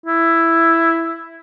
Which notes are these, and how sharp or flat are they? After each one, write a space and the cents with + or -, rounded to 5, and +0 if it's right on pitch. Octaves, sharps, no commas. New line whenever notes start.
E4 +5